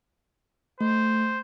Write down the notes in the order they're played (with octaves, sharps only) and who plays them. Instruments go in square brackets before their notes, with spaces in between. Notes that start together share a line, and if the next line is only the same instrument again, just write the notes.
[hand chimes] A3 [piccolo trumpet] C5